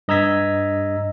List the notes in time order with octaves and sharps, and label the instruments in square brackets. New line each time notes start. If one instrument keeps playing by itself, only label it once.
[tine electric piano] G2 D#5 A#5 E6 G#6 B6